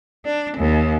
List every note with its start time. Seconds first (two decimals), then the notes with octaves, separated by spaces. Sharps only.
0.25 D4
0.57 D#2